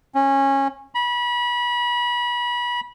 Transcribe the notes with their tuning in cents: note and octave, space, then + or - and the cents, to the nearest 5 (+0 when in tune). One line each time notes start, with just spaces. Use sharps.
C#4 -20
B5 -30